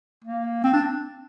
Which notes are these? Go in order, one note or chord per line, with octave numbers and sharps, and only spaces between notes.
A#3
C4
D4